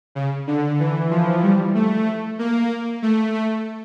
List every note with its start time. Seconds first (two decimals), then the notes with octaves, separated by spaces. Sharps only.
0.15 C#3
0.47 D3
0.80 E3
1.10 F3
1.43 G3
1.75 A3
2.39 A#3
3.02 A3
3.34 A3